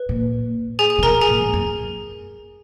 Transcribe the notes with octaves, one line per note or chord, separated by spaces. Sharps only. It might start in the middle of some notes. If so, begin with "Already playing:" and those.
Already playing: B4
A#2
G#4 G#5
G#4 G#5
C#3
B2 A#4 A#5
G#4 G#5
A#2
G#2
F#2